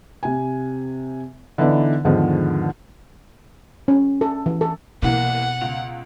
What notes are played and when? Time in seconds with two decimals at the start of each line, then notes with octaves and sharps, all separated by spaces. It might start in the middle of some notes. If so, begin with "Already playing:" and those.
0.23 C3 G#5
1.58 D3 E3 B3 D#4 E4 D5
2.05 E2 G#2 D3 D#3 F3
3.88 C#4
4.21 A4
4.46 E3
4.61 A4
5.02 C2 B2 E3 A#3 F#5
5.61 C#2 F7